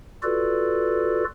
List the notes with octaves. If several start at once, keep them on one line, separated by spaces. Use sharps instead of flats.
F4 F#4 A4 B4 D5